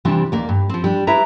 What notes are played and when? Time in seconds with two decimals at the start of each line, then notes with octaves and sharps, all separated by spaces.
0.05 C3 E3 G3 C4 D4
0.32 D#2 A#3 D5
0.49 G2
0.70 F3 C4
0.84 G3 D4
1.07 E4 G4 B4 E5 A#5